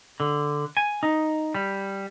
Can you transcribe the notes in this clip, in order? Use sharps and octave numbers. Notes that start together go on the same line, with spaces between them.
D3
G#5
D#4
G3